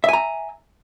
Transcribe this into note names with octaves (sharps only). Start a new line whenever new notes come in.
E5 G#5 A#5